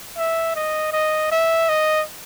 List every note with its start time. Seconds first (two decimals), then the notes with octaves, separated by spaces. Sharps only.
0.17 E5
0.55 D#5
0.93 D#5
1.32 E5
1.69 D#5